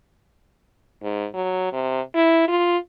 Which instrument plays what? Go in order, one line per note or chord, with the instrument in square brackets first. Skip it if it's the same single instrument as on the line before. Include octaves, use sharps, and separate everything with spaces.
[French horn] G#2
F#3
C3
E4
F4